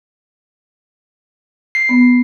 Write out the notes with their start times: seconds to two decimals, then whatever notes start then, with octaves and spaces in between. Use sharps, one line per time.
1.75 C7
1.89 B3